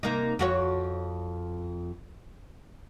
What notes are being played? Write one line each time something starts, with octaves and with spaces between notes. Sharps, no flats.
C3 A#3 D#4
F2 F#4 C#5